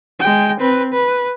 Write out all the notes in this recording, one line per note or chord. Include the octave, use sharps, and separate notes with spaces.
G#3 G5
C4 B4
B4